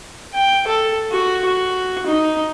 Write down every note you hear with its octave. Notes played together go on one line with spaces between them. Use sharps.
G5
A4
F#4
F#4
D#4